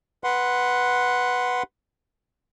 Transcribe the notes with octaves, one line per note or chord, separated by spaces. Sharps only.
B4 F#5 C6